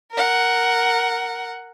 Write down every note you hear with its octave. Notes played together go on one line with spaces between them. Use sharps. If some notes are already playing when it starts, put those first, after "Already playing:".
A#4 F#5